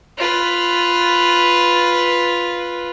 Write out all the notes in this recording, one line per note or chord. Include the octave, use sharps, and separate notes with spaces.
F4 B4